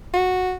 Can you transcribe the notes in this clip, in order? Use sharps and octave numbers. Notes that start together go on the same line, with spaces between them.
F#4